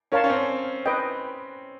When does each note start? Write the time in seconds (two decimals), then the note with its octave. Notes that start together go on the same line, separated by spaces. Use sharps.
0.12 C#4 A#4 C#5 F5 A5 C6
0.24 C#4
0.30 C4
0.86 B4 D#5 G5